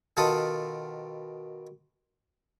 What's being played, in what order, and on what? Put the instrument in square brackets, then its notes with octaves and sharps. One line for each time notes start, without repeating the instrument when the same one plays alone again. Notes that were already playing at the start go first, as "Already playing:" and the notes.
[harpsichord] B2 D#3 F4 A4 A5 D#6